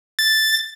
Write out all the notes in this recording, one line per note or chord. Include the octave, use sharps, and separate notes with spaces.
A6